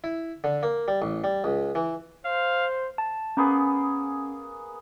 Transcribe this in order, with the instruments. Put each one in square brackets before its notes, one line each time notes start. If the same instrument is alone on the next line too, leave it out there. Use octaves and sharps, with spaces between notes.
[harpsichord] E4
D3
A#3
G3
A1
G3
C#2
E3
[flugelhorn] C5 [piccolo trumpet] F5
[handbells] A5
[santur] A#3 B3 G#4 [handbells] C#4